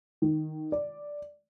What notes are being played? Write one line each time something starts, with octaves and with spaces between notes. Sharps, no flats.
D#3
D5